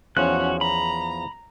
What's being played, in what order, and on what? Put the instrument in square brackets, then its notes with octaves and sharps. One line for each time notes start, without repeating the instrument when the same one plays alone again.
[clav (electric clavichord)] E2 F3 [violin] C#4 [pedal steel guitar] F#4 F#6
[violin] A#5 [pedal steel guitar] B5